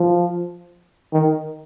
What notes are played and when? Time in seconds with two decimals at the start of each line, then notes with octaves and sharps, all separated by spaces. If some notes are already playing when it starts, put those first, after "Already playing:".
Already playing: F3
1.13 D#3